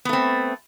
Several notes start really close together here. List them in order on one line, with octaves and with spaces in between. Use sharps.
B3 A3 C4